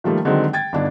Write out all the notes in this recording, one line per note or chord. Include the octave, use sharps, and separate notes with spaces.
D#3 F3 G3 A3 A#3
D3 D#3 F#3 G#3 C4 D#4
G5 G#6 A6
G1 D3 D4 D#4